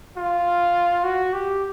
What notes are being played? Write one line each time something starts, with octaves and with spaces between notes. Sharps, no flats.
F4
F#4
G4